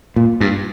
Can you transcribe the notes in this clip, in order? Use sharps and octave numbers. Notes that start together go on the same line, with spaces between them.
A#2
G2